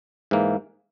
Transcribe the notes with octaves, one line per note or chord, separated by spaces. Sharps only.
G#2 E3 A#3